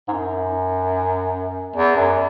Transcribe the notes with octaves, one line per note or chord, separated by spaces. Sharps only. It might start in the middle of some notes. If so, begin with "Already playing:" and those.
G#2
F#2
E2
F#2